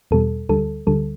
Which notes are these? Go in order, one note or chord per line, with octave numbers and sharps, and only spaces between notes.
E2 B2 G3 A4
D2 D3 G3 A4
D2 D3 G3 A4